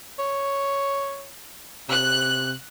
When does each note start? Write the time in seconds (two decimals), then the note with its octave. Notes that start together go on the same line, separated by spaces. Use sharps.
0.19 C#5
1.89 C3 F#6